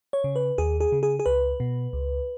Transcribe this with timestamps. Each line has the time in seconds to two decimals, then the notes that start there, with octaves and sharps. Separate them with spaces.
0.13 C#5
0.24 C#3
0.36 B4
0.58 D#2 G#4
0.80 G#4
0.92 C#3
1.03 G#4
1.20 G#4
1.26 C#2 B4
1.60 B2
1.93 C#2